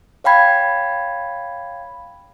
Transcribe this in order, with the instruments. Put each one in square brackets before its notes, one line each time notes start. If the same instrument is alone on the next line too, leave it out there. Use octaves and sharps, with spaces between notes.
[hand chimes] C#5 F5 G5 B5 G#6